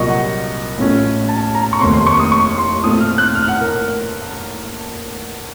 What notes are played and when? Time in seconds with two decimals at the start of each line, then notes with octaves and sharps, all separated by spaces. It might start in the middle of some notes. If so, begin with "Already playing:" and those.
Already playing: C2 A#2 F#3 A#3 F4 D#5 C#6
0.09 F#5
0.78 A1 A2 A3 C#4 F4
1.29 A5
1.55 A#5
1.73 C#6
1.81 F1 D#2 D#3 A3 C4 C6
1.94 C6
2.07 C#6
2.19 D#6
2.32 C#6
2.58 C6
2.84 A#2 A3 C4 F4 D#6
3.01 F6
3.18 F#6
3.35 F6
3.48 F#5
3.61 A#4